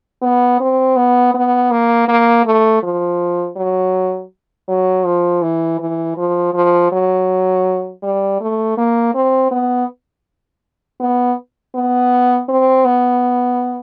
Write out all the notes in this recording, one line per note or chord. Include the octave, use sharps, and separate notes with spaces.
B3
C4
B3
B3
A#3
A#3
A3
F3
F#3
F#3
F3
E3
E3
F3
F3
F#3
G3
A3
A#3
C4
B3
B3
B3
C4
B3